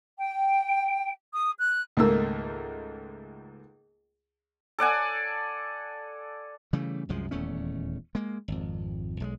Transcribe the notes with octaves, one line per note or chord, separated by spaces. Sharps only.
G5
D#6
F#6
C#2 G#2 D#3 A3 A#3 E6
A4 D5 F#5 G#5
C#3 E3 G3 A3
C2 F#2 F3 G#3
D#1 E2 A3 C#4
G#3 A#3
G#1 F2
B1 F#3 G#3